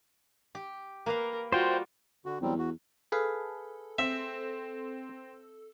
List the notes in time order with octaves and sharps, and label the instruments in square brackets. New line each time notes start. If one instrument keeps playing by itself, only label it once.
[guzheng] G4
[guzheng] A#3 B4 F5 [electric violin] A#4
[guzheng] G3 [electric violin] F4 F#4 [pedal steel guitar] C5 G5
[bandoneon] D3 F#4
[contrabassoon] E2 [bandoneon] F#3 G3 C4
[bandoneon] F#4
[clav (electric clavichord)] G#4 B4 F5 [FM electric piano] A4
[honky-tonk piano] C4 [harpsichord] E5